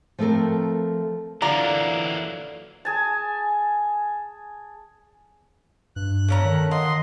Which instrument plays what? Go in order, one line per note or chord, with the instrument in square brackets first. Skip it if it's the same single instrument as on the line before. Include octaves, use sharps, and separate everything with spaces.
[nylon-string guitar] F3 A3 C4 A4 A#4
[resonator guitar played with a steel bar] D3 F4 D5 [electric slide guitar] E3 F#3 A#3 [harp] A#5
[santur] G#4 G#5 A5
[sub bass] G2 [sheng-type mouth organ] F#6
[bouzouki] A3 C#4 A#5
[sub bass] D#3
[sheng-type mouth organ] D#5 C6 [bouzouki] F#5